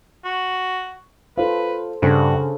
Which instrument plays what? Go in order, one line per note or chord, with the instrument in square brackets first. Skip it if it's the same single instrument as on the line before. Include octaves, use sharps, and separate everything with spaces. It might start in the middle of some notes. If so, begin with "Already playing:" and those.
[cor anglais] F#4
[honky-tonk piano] F4 [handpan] A4 C5 [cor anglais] B4
[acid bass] G2 [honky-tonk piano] C#3 [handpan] D4 A4 C5 [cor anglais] F#4